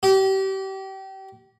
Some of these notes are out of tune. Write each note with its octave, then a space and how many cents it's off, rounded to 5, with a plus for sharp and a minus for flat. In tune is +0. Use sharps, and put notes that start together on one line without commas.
G4 -30